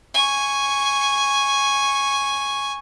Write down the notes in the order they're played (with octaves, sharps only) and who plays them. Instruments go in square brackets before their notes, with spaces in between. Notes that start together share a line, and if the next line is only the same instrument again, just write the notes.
[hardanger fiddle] G#5 C#6